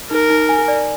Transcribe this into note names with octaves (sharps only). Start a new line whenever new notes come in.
D#4 A#4
D#4
G#5
D5